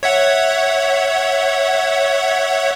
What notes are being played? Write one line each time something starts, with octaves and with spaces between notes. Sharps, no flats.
C#5 E5 F#5